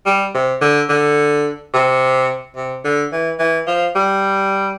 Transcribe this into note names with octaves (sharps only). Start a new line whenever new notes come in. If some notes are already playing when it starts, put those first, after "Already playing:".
G3
C3
D3
D3
C3
C3
D3
E3
E3
F3
G3